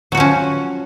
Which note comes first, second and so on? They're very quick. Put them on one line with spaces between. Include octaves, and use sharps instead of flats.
F#3 F#4 F3 C#4